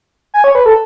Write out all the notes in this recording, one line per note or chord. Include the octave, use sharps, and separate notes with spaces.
G#5
C#5
B4
A4